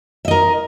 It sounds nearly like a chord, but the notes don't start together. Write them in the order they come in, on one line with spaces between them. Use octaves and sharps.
E5 D#5 A#4